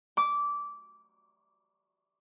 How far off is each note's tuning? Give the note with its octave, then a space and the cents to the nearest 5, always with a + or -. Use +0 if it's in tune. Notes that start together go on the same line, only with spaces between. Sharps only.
D6 -15